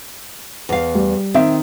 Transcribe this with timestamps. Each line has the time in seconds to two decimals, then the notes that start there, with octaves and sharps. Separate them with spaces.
0.69 E2 F5
0.95 G3
1.34 D#3 C4 E5